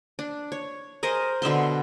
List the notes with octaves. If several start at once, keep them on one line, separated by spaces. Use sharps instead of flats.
D4
C#5
G#4 A#4 C5 D#5
B2 D3 E5 C6